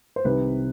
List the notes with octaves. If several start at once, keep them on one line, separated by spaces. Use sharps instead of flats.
C5
C2 C3 D#3 B4